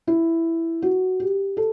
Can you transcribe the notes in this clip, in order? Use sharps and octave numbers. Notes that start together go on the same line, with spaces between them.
E4
F#4
G4
A4